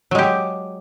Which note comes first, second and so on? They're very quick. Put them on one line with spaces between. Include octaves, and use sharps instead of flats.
F#3 G#3 G4